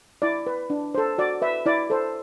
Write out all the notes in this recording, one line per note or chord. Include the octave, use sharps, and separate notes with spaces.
E4 D5
B4
D4
A4 C5
F#4 D5
B4 E5
E4 D5
A4 C5